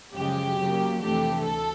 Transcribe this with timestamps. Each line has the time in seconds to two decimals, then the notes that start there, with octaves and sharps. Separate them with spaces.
0.14 F#2 C#3 F3 G#3 G4
0.58 C#3 F#3 A#3
1.01 F2 C3 E3 A3 D4 G4
1.44 D2 A4